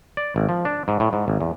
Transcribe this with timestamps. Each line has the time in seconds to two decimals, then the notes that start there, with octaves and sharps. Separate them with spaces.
0.17 D5
0.36 G#1
0.49 F3
0.65 D4
0.88 G#2
1.00 A2
1.13 G#2
1.28 G#1
1.40 E2